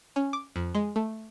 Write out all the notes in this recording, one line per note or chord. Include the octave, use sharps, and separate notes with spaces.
C#4
D6
F2
G#3
A3